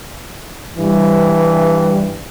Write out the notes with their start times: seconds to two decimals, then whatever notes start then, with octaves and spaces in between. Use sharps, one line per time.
0.77 G2 E3 G3